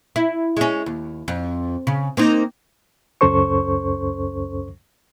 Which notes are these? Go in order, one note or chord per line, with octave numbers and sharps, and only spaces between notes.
E4
G#3 C#4
D#2
F2
C#3
A#3 C4 D#4
C#2 F#2 C#4 A4 C5 C#6